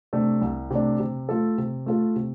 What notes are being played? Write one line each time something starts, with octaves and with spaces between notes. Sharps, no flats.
C3 A3 D4
C2
C3 A3 D4
C3
A3 F4 A4
C3
A3 F4 A4
C3